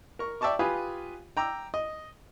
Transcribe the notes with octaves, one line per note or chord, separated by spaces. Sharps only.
A#4 C#6
D5 E5 G5 A5 C#6 D6
F4 G4 B4 F5 G#5 D#6
G5 A#5 D6 E6
D#5